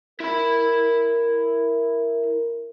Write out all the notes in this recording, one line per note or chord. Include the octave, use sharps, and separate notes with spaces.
E4 A#4 B5